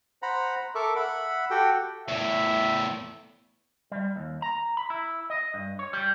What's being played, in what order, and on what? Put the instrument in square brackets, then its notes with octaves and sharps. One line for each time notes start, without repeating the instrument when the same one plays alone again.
[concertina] C5 F#5 A#5 B5
A4 A#4 E5 C#6 D6
E5 F#5 B5
F#4 G4 A4 F#5 G5
[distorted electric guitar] E2 A2 [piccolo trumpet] E5
[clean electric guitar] G3
D#2
A#5
B5
E4
D#5
G2
C#5
G3